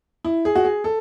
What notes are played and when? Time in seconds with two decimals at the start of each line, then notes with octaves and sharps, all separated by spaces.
0.24 E4
0.45 G#4
0.55 F#4
0.65 G#4
0.84 A4